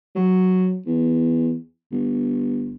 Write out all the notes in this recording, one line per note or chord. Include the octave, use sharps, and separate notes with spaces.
F#3
E2
G1